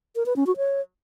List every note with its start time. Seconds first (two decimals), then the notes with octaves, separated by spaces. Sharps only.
0.16 A#4
0.26 B4
0.36 C#4
0.47 F#4
0.57 C#5